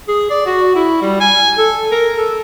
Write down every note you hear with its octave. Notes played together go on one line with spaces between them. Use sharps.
G#4
D5
F#4
E4
G3
G#5
A4
A#4
A4